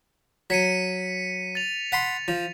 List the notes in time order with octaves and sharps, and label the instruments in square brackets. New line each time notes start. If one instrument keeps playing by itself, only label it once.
[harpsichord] F#3 [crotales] B6 C#7 D#7
[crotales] A6 F7
[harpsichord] F#5 B5 C6
F3